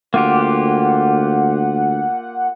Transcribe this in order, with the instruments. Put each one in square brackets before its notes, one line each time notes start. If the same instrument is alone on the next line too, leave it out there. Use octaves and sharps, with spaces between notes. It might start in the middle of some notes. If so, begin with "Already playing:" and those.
[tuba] D2 [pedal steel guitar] A#3 F4 G4 [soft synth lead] F#5